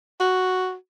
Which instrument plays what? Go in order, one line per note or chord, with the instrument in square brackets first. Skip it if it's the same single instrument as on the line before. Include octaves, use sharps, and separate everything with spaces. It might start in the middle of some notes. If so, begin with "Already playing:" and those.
[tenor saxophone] F#4